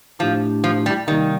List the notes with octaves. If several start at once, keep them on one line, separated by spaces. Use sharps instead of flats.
A2 F3 A3 D4 G4
F3
G3
C3 D#3 G3 A#3 D#4